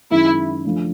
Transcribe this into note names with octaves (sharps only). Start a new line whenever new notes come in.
F#2 D#3 G#3 E4
F3 A3 D4